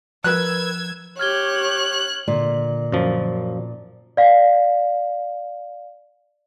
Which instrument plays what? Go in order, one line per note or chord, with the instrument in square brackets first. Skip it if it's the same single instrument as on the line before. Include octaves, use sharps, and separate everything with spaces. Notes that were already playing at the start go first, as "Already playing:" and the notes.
[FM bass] F3 [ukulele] A#4 B4 G5 [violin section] E6 G#6 [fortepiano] F#6
[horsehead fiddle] G4 [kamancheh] C#5 [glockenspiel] F6 G#6 G7 [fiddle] F#6
[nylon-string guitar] A#2 [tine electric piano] D3 [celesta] D5
[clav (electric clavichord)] F#2 F3
[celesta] D5 F5